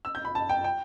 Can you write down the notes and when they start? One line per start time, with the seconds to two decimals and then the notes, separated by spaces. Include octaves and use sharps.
0.05 E6
0.15 G6
0.25 B5
0.35 A5
0.49 G5
0.64 G5